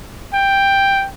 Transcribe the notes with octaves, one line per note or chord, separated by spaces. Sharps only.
G5